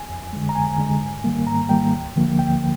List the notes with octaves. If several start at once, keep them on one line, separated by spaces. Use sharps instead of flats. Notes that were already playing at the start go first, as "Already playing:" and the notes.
Already playing: G#5
F2
D3 G#3
A#5
F2 G#5
D3 G#3
G#2
D#3 G3 A#3
G#2 A#5
D#3 G3 A#3 G5
D2
D3 F3 A#3
D2 G5